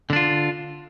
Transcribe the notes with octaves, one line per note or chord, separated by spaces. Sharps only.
D3 D4 F4